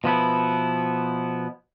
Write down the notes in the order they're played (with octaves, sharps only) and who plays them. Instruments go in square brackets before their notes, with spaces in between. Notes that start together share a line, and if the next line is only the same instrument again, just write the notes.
[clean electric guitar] B2 F3 B3 E4